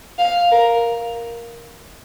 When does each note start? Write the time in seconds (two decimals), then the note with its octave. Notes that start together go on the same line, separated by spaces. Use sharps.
0.19 F5
0.51 A#4